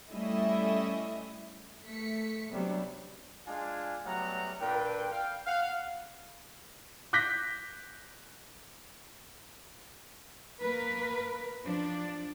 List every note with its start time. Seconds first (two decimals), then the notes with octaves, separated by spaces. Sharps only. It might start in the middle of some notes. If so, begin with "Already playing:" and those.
0.11 G3 A3 C#4 E4 D#5 E5
1.84 A3 B6 C#7
2.51 C3 F#3 G3 B3 D4
3.48 G#3 D4 F4 G#5
4.05 F#3 G3 A3 B3 F#5 A#5
4.60 A#2 D4 A4 B4 G5
5.11 F5 G5
5.46 F5 F#5
7.13 D6 F#6 G6 A#6 B6
10.62 A#3 A#4 B4
11.64 F3 D4